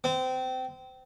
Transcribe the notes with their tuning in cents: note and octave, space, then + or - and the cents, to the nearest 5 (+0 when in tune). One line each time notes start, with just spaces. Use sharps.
C4 -25